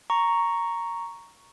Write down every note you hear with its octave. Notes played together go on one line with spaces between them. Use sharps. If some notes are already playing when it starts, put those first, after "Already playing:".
A#5 C#6